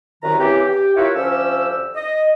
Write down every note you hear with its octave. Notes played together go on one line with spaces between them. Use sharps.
C2 F#2 D#3 B4 A#5
C#3 E3 C4 G4
G4 G5
E4 F4 A#4 B4 C#5 E5
D2 F3 C#4 G4 E6
D#5